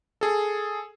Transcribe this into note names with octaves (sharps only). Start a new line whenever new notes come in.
G#4 A4